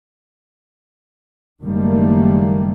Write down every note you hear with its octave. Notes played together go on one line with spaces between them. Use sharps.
F#1 D#3 G3 A3 A#3